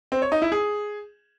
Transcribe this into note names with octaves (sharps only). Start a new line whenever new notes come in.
C4
C#5
D#4
E4
G#4